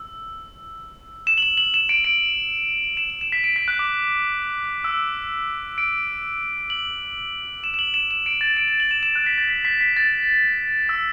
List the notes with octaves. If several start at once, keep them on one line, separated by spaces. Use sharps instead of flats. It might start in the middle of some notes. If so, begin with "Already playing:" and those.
Already playing: E6
E7
F#7
E7
F#7
E7
D7
D7
E7
E7
E7
B6
D7
B6
F#6
D6
E6
D7
F#7
E7
E7
F#7
E7
E7
D7
A6
D7
E7
F#7
E7
E7
F#6
B6
A6
B6
B6
B6
A6
E6